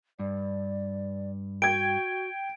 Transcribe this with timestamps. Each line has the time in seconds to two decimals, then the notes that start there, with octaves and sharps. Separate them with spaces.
0.19 G2 D5
1.62 F#4 G5 G#6 D7